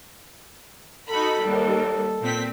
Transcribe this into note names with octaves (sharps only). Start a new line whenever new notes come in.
D#4 F#4 A4 B5
D#2 G3
A#2 C4 B6